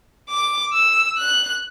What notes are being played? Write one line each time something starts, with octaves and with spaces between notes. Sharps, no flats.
D6
E6
F#6